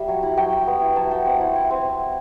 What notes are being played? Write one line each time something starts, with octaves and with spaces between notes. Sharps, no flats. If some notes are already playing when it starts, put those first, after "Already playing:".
Already playing: G3 E5
F#3
E4
F#3 G5
E4
B3
E4
F#3 A5
F#3 G5
C4 F#5
E4
E4
C4